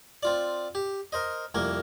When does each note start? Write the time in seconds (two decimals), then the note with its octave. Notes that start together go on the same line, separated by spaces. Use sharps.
0.23 C4 F4 D5
0.75 G4
1.12 A#4 C5 D#5
1.54 C2 F2 A#3 A#4